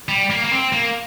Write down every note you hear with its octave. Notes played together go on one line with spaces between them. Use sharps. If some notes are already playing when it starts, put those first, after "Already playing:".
G3
A#3
A#3
C4
A#3